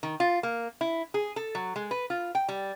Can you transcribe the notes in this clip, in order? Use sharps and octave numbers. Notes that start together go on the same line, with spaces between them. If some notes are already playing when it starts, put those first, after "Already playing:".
D#3
F4
A#3
E4
G#4
A4
F#3
G#3
B4
F4
G5
G3